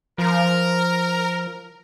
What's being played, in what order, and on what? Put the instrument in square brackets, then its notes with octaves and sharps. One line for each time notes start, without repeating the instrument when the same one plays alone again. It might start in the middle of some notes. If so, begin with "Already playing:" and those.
[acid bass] F3 [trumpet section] A#4